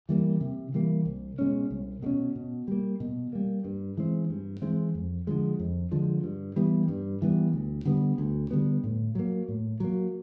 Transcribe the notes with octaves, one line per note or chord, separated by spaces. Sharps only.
E3 G3 A#3
C3
E3 G3 A#3
C2
B2 G#3 C#4
C2
B2 G#3 C#4
B2
G3 A#3
B2
G3 A#3
G2
E3 G#3 C4
G2
E3 G#3 C4
F2
D3 F3 G#3
F2
D3 F3 G#3
G2
E3 G3 B3
G2
E3 G3 B3
D2
D3 G3 B3
D2
D3 G3 B3
A2
F#3 A#3
A2
F#3 A#3